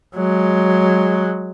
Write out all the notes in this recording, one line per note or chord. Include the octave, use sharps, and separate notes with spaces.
F#3 G#3